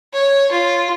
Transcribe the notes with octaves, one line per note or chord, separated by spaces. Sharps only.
C#5
F4